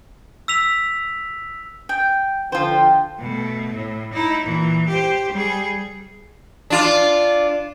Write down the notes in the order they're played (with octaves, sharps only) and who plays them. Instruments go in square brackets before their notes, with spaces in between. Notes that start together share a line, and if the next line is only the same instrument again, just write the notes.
[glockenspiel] E6 B6 F7
[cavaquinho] G5
[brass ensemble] D3 F3 G5 [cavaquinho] F4 C5
[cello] B2 A3
A2
D#4 E4
A#2 E3
G4 C5
G3 G#4
[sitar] D4 F4